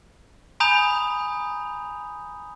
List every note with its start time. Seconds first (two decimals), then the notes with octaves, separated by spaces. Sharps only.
0.60 G#5 A#5 B5 D#6 G6 F7